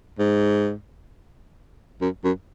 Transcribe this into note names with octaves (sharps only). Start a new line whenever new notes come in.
G#2
F#2
F#2